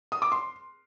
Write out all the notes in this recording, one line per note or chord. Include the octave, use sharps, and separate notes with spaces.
D#6
D6
C6